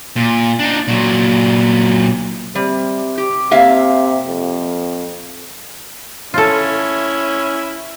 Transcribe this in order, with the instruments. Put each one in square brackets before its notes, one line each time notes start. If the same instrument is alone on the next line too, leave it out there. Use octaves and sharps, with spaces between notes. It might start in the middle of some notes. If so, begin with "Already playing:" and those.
[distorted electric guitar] A#2
D4 D#4
A#2 F#3
[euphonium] C3 [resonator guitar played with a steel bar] G3
[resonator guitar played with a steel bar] G4
[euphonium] C3 [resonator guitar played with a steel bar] A#3 E5 F5
[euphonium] F2
[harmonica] C#4 E4 [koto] F4 A4